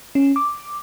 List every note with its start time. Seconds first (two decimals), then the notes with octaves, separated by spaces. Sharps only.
0.15 C#4
0.36 D6